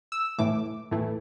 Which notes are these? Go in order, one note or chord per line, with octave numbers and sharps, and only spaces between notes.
E6
A2 E3 A3 D6
A2 E3 A3